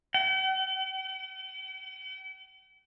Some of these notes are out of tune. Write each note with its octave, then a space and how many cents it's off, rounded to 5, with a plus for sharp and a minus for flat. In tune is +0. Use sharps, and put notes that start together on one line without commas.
G5 -45